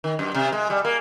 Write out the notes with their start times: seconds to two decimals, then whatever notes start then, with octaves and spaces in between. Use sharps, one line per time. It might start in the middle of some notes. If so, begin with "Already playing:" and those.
0.04 D#3
0.19 F#2
0.34 C3
0.52 G#3
0.70 G3
0.85 A#3